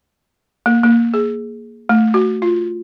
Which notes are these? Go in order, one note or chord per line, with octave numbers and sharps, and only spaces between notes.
A#3
A#3
G#4
A3
F#4
F4